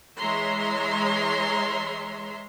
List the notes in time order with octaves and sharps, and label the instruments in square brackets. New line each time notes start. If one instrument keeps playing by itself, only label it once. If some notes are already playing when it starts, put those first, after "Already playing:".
[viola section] E3 G#3 C#5 E5 A#5 C6